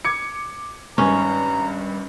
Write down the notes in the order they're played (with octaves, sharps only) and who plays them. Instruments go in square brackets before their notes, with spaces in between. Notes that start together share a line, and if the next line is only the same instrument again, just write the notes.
[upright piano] D6 G#6 C#7
[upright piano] G#1 G2 [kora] C#4 [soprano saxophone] A#5